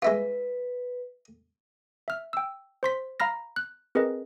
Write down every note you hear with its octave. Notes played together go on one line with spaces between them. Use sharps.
G#3 E4 F4 B4
E5 F6
G5 E6
C5 C6 B6
F5 A#5 B5 F6 A#6
F#6
C4 G#4 A#4 B4 D#5